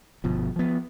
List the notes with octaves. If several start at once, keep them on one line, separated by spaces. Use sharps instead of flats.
G1 B2 F3
F3 B3